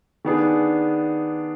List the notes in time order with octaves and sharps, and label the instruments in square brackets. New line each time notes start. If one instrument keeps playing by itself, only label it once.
[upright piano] D#3 B3 D4 G#4